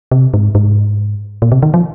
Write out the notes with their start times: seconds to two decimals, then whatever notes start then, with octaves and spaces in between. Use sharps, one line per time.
0.12 C3
0.34 G#2
0.55 G#2
1.42 A#2
1.52 C3
1.63 D#3
1.74 F3